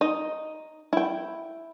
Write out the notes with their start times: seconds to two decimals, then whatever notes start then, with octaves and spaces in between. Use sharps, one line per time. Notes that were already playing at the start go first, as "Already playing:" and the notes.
0.01 D#4 D#5
0.93 E4 G5